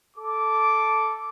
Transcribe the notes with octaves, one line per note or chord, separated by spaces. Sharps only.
A4 D6